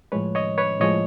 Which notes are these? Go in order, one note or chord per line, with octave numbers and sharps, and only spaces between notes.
A2 F3 G#3 B4 C#5
C#5 D#5
B4 C#5
A2 F3 G#3 C#5 D#5